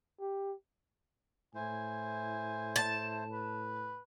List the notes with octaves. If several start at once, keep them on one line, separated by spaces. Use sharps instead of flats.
G4
A2 E4 C5 G#5
A5
B4